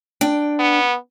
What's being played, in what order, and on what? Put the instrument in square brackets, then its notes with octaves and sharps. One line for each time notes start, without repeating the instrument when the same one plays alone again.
[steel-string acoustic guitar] D4 G5
[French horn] B3